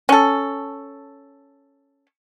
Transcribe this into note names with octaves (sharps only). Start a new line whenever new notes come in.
C#4 A4